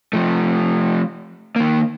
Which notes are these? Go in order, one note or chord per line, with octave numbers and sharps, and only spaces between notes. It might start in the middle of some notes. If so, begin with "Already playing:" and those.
F3 A3
D#3 A#3